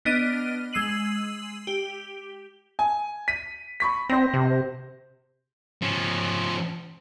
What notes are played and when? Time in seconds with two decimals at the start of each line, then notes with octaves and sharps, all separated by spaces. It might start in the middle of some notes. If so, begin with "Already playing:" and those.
0.05 B3 D4 D#5 F6 D#7
0.73 G#3 E6 C7 D#7 F#7
1.67 G4
2.79 G#5
3.28 B6 D#7
3.80 B5 C#6 B6
4.10 C4 C5 A#6
4.34 C3
5.83 F3 C#4